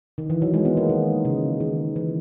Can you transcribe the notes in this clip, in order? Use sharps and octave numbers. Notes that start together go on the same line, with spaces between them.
D#3
E3
F#3
G#3
B3
A#3
D#3
C#3
D#3
E3